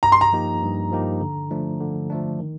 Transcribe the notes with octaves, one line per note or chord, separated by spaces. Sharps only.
G2 A#5
C6
A#5
F3 A#3 D#4 G4
G2
F3 A#3 D#4 G4
D3
F3 A3 D4
D3
F3 A3 D4
D#3